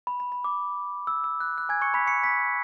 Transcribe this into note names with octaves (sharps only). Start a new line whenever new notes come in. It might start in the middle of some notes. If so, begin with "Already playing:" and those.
B5
B5
B5
D6
E6
E6
F#6
F#6
G#5 G#6
C#6 C#7
B5 B6
C#6 C#7
B5 B6